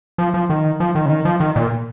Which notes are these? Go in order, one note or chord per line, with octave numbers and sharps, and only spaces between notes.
F3
F3
D#3
F3
D#3
C#3
D#3
F3
D#3
A#2